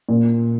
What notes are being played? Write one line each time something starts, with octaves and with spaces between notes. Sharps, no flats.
A#2